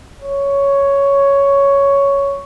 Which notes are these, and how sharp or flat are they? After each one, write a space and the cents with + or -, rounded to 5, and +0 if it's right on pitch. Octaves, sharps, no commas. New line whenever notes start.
C#5 +5